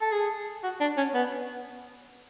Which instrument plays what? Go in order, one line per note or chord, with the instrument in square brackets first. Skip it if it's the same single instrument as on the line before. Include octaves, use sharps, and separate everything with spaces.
[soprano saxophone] A4
G#4
F#4
D4
C#4
B3